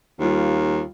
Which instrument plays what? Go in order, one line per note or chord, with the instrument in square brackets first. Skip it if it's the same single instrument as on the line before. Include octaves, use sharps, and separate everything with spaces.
[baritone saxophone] D#2 [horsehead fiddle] G3 F4